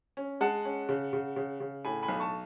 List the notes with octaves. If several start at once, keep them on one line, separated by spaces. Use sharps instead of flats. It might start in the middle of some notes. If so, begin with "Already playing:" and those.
C#4
G#3 F#5 A5
C#4
C#3
C#3
C#3
C#3
A2 G#5 B5
G#5 B5
B1
A5 C#6